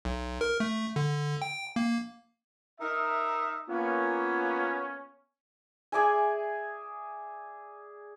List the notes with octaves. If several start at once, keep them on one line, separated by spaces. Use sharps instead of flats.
B1
A#4
A3
D3
G5
A#3
D#4 A#4 E5
A#3 B3 C#4 F4
G#4 D5 E5 G#5